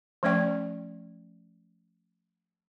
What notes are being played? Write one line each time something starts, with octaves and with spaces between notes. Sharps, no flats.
F3 A3 C#4 D5 G5 C#6